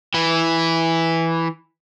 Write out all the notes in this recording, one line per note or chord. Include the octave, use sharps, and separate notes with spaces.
E3 E4